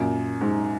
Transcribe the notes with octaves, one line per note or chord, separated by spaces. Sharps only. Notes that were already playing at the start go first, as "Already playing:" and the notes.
Already playing: F#2 A#2
G#2